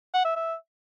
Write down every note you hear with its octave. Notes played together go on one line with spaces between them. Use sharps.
F#5
E5
E5